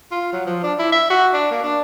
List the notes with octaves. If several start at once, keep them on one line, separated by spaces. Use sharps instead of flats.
F4
F#3
F3
D4
E4
E5
F#4
D4
A#3
D4